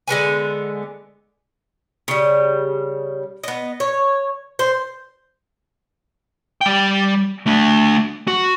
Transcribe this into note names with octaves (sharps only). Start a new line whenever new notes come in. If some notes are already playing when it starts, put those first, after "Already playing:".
D3 G#3 B3 G#5
C#3 G3
B3 D#5
C#5
C5
G3 G5
A3 D4
F#4